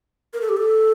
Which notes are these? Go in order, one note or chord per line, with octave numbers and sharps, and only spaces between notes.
A#4
A4
G4
A4